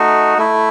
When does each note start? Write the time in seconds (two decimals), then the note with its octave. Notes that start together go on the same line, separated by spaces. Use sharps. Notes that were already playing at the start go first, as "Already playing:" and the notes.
Already playing: A3 D#4 F#4
0.38 A3 E4